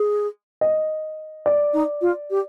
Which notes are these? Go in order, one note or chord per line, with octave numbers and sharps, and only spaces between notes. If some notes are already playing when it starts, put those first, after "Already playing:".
Already playing: G#4
D#5
D5
D#4
F4
G4